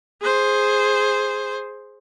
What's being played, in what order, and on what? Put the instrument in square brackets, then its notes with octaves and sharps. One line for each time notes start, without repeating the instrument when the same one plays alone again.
[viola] G#4 C5